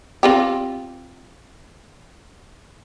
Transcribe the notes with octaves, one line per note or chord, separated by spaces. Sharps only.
C4 F4 G4